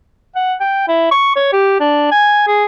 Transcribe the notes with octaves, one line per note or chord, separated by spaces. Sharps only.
F#5
G5
E4
C#6
C#5
G4
D4
G#5
G#4